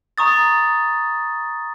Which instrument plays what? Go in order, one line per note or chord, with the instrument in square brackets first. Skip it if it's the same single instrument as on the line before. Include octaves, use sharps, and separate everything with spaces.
[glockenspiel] A#5 C#6 D#6 A6